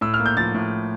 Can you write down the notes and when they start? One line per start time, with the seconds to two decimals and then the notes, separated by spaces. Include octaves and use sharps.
0.01 A2 E6
0.14 F6
0.19 A#3
0.26 G6
0.37 F3 A6
0.55 A2